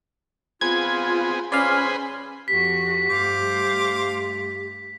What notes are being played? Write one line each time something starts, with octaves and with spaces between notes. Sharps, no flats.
B3 C4 F4 G#4 G#6
C#4 G#4 B4 C5 D5 F5
F2 F#4 G4 B6
G2 A3 C5 F5 D6